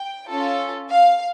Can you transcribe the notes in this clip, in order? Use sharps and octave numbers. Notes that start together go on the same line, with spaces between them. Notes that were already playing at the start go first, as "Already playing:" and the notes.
Already playing: G5
C#4 F4 A4
F5